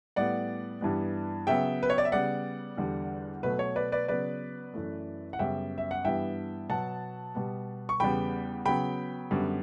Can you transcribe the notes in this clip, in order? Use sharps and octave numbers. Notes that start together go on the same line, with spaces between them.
A2 G3 B3 D5 F#5
G2 E3 G3 B3
C#3 F#3 B3 E5 G5
B4
C#5
D5
E5
C#3 G3 B3 D5 F#5
E2 D3 G3
B2 F#3 A3 B4
C#5
B4 D5
B4 D5
C#3 F#3 B3 B4 D5
F#2 E3 A3
F#5
F#2 C#3 G3 B3 E5 G5
E5
F#5
G2 E3 G3 B3 E5 G5
B2 F#3 B3 F#5 A5
B2 G3 B3
C#6
E2 C#3 G3 B3 G5 B5
C#3 F#3 B3 G5 B5
F#2 D3 G3 B3